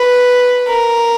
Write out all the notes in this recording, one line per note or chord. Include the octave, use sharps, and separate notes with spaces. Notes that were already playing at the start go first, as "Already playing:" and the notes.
Already playing: B4
A#4